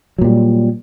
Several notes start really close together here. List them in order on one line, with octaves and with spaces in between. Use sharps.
F#3 A#2 G3